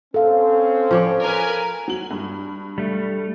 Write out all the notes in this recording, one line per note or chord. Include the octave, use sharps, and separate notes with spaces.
C4 C#4 A4 C5 F5
F3 C#5 D5
A#4 B4 G#5
F#3 F#7
G2
G3 A3